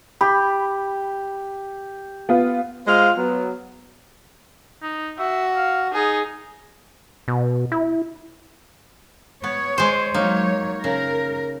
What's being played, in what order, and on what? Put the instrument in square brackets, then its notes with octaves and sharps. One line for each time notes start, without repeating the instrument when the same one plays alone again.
[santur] G4 [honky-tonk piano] B5
[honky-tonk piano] B3 F4
[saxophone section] G#3 F4 C5 D#5 F5
F#3 B3
[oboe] D#4
[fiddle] F#4 [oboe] E5
[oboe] F5
[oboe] D#4 [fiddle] G#4
[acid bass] B2
E4
[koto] B3 [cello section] C#5
[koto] G#3 C5
[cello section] F#3 G#3 C#5 [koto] A#3 D#4
[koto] C#3 [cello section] A#4